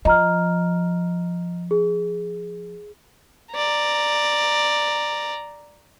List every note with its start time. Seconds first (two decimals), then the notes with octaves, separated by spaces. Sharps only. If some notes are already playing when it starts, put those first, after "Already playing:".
0.05 F3 D#5 A#5 F6
1.71 G#4
3.53 D5 A#5